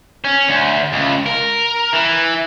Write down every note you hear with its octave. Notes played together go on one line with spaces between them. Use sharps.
C#4
D2
C#2
A#4
E3